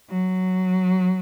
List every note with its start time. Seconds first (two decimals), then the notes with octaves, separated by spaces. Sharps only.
0.10 F#3